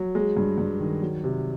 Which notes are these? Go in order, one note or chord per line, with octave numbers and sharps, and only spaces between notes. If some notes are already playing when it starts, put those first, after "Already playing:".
Already playing: F#3
G#3
G2
G2
D#3
F#3
C3